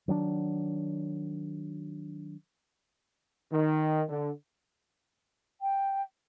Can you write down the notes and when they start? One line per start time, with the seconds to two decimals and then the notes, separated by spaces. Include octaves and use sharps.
0.08 D#3 F#3 A#3 D4
3.52 D#3
4.09 D3
5.61 G5